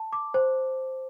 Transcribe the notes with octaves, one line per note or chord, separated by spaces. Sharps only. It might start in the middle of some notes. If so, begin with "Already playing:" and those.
Already playing: A5
D6
C5